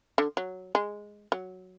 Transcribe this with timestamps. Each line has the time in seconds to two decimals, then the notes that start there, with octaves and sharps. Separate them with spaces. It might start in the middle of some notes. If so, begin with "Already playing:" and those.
0.18 D3
0.37 F#3
0.75 G#3
1.32 F#3